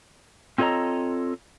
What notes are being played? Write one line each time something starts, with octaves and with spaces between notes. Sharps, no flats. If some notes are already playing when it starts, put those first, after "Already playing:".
C4 F4 A4 C#5 D#5 A#5